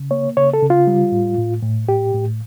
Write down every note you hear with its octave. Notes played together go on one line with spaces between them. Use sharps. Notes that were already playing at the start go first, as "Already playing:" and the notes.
Already playing: C#3
A#3 C#5
C#3 C#5
A4
C#3
F4
G3
A2
A2
A2
A2 G4
A2